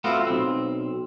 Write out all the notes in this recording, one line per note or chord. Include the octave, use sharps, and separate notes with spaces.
A3 B3 C4 F4 F#4
B1 C4